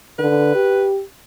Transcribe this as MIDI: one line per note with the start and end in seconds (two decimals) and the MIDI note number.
0.19 0.51 50
0.19 0.87 71
0.55 1.02 67